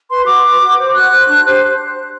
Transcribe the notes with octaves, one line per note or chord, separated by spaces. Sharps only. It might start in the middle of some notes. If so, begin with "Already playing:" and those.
B4 C6
F#4 D6
B4
F#4
C5
F#4 F#6
C5
D4
G4 C5